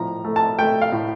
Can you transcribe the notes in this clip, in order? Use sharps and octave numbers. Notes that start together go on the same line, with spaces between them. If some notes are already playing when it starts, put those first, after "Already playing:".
Already playing: A2 F3 A#5
A3
A5
A3 G5
F5
A2